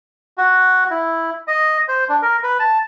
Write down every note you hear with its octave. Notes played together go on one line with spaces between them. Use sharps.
F#4
E4
D#5
C5
D4
A#4
B4
A5